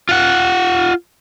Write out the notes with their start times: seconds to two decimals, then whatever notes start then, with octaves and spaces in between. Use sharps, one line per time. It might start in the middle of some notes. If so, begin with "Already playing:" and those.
0.09 F4 F#5